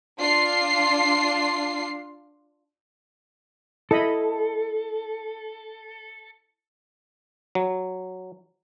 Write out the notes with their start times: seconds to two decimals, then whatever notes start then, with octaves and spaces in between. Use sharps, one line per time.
0.20 D4 F4 C7
3.91 E4 A4 D#5 B5
7.55 F#3